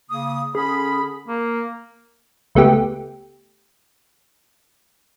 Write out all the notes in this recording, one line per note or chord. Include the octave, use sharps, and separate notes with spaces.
C#3 A#3 D#6
D3 C#4 G#4 B5
A#3
C#2 A3 B3 G4